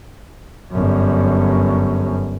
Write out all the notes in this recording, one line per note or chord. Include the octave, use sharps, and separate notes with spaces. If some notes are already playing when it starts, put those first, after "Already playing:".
G1 F#2